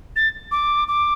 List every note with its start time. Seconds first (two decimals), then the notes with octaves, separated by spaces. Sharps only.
0.16 A6
0.51 D6
0.88 D6